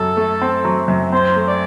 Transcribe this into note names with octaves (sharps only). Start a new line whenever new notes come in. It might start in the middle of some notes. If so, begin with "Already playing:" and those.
Already playing: F#2 F#3 A4
A3
C4
F#3
F#2
C4 C5
A3
D5